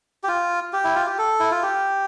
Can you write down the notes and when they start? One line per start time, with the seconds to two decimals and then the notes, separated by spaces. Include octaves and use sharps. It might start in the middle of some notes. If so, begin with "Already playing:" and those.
0.24 G4
0.28 F4
0.73 G4
0.84 E4
0.95 F4
1.07 G4
1.19 A4
1.40 E4
1.51 F4
1.63 G4